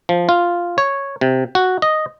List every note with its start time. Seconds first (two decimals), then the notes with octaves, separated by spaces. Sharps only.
0.09 F3
0.29 F4
0.78 C#5
1.21 C3
1.55 F#4
1.82 D#5